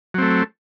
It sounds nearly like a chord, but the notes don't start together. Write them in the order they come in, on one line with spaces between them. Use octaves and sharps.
F#3 C4 A3